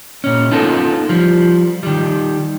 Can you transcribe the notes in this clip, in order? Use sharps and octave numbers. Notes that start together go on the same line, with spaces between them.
A#2 C#4
B3 C#4 D#4 F4 A4 A#4
F3 G3
D#3 G3